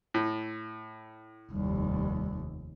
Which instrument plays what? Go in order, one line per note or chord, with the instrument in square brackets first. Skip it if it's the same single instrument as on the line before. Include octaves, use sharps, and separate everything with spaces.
[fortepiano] A2
[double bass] F1 D#2 [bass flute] G3